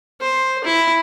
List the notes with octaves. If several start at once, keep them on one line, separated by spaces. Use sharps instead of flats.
C5
E4